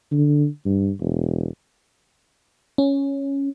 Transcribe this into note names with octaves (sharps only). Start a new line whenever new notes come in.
D3
G2
E1
C#4